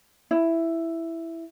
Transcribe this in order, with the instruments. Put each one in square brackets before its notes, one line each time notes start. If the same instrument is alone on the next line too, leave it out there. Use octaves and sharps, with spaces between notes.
[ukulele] E4